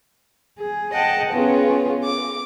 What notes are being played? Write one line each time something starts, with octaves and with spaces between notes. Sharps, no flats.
G#4
D#5 F#5 G5 A5
B3 C#4 F4 G#4
D6